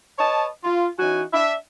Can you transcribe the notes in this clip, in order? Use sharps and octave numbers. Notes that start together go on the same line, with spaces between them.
B4 C#5 D#5 A5
F4
E3 C#4 D#4 F#4 G#5
D4 E5